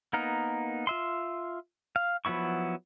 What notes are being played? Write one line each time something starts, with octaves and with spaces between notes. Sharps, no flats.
A#3 B3 D#4 A#4
F4 E5 C6
F5
F3 F#3 B3 E4 C#6